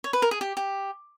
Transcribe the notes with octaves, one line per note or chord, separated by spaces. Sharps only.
C#5
B4
A#4
G#4
G4
G4